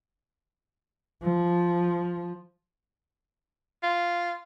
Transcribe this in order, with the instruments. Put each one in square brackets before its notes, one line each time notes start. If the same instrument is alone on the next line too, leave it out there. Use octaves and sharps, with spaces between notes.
[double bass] F3
[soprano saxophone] F4